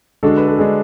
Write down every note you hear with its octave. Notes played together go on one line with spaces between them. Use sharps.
D3 G#3 D4 F#4 A4
B4
A4
D3 G#3 D4 G#4